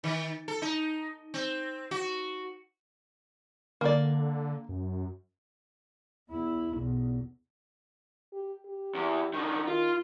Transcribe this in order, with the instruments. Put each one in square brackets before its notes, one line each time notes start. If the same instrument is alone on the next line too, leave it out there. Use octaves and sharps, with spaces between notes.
[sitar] D#3
A4
D#4
C4
F#4
[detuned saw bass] D3 [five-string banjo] A#3 D5
[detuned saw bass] F#2
[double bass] E2 E4
B1 E2
[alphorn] G4
G4
[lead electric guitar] E2
D3 D#3
[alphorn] D#3 [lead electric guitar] F4